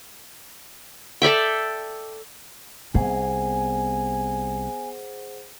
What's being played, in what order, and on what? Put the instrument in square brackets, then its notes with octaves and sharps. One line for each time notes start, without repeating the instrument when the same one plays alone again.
[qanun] A4 D5 E5 G5
[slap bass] C2 [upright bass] B3 [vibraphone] G#4 C5 F#5 [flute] G#5